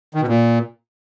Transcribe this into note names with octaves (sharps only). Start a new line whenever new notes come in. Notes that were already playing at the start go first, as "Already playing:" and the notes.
D#3
B2
A#2